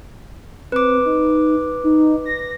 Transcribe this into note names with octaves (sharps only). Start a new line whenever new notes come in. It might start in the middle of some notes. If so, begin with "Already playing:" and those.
C4 B4 D6
D#4
D#4
A#6